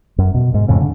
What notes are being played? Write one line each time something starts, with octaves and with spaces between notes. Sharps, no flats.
F#2
B2
G#2
F2 A2 C#3
D3